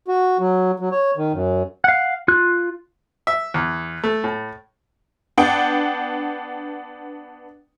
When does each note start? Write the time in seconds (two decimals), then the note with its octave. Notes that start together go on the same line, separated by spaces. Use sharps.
0.08 F#4
0.39 F#3
0.80 F#3
0.92 C#5
1.17 D#3
1.33 F#2
1.84 F5 F#5
2.28 F4 F#6
3.27 E5
3.54 E2
4.03 A3
4.24 A2
5.37 B3 D4 G5